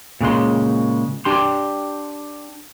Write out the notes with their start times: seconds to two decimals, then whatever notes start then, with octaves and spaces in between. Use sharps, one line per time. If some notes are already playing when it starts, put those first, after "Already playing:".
0.21 A#2 C#3 G#3 C6
1.25 D4 G4 C6